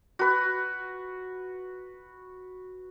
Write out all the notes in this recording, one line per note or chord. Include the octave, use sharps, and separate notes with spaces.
F#4 B4